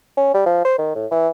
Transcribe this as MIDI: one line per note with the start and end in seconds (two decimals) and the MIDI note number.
0.17 0.31 61
0.34 0.41 55
0.46 0.60 53
0.65 0.73 72
0.78 0.93 51
0.95 1.06 45
1.11 1.28 52